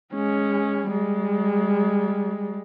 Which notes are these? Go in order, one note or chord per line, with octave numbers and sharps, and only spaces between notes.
G#3 C#4
G3 G#3